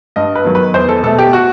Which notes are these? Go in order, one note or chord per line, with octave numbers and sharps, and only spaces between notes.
G2 D#5
B4
D#3 F#3 B3
B4
E2 C5
A4
B2 A3 A4
G4
F#4